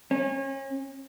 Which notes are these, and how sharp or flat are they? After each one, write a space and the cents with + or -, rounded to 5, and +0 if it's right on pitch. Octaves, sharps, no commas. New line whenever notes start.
C#4 -35